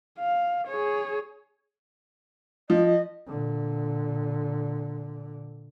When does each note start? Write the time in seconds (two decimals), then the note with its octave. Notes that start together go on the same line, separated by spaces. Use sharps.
0.19 F5
0.67 G#4 C#5
2.70 F3 D#5
3.27 A#2 D3